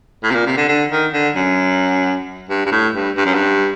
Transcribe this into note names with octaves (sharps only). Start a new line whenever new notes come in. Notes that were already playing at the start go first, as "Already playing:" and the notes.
A2
C3
A#2
C3
D3
D3
D#3
D3
F#2
G2
G2
A2
G2
G2
F#2
G2